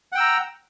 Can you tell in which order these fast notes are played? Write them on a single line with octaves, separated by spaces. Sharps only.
F#5 G5 E6 A#5